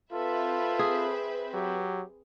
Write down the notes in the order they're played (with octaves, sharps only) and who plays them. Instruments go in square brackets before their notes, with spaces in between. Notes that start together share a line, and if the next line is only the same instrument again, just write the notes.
[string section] C4 B4 E5 [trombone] F4 [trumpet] A4
[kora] G#4
[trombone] F#3 [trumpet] G4